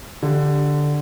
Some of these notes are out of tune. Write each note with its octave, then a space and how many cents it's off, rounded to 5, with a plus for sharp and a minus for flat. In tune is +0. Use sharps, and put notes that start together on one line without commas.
D3 +0 G4 +0